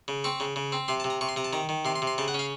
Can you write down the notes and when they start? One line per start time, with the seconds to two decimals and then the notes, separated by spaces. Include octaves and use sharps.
0.08 C#3
0.24 C4 C#6
0.40 C#3
0.56 C#3
0.72 C4
0.88 C3 C6
1.00 A5
1.04 C3
1.10 A#5
1.21 C3 C#6
1.29 C6
1.36 C3 A#5
1.44 A5
1.53 D#3 A#5
1.69 D#3
1.85 C3 C6
1.95 C6
2.02 C3
2.07 C6
2.18 C#3 A5
2.28 F#5
2.34 C#4 F5